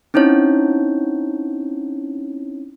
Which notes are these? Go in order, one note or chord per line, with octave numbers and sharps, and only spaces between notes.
C4 C#4 D#4 E4 C#5